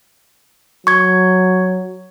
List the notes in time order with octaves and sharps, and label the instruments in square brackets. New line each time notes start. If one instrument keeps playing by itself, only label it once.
[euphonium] F#3 [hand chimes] C#6 G#6